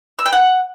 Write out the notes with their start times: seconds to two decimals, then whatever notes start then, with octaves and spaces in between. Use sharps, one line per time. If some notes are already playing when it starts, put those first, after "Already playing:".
0.19 E6
0.26 G5
0.33 F#5